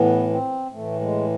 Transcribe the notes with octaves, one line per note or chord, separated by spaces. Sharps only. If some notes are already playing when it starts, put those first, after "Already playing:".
Already playing: A2 E3 B3
C4
A2 E3 A3
G#3